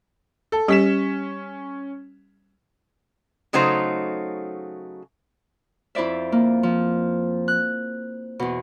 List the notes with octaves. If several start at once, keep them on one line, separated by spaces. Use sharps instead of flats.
A4
G3 C#4 G4 B6 E7
C#3 F#3 A3 D#4 C5 A#5
F2 E4 C5 D5 E5
A#3
F3
F#6
E2 B2